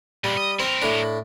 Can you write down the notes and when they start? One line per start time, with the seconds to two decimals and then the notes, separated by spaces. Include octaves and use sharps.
0.24 A#2 G3 G#3
0.37 D#5
0.60 C4 E4 A#4
0.82 A2 D4